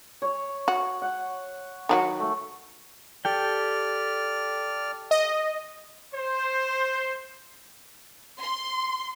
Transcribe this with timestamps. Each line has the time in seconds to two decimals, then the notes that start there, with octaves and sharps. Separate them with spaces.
0.22 C#5
0.68 F#4
1.02 F#5
1.89 D#3 F#3 F#4
2.20 A3
3.25 G4 A4 D5 G5 F6
5.11 D#5
6.14 C5
8.40 C6